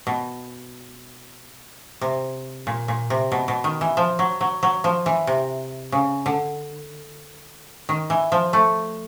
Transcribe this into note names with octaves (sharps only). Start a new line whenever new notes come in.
B2
C3
A#2
A#2
C3
B2
B2
D#3
E3
F3
F#3
F#3
F#3
F3
E3
C3
C#3
D3
D#3
E3
F3
A3